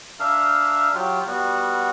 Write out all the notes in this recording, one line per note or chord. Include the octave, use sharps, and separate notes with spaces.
D4 A#4 E5 F5
F#3 F4 G4
G3 B3 F#4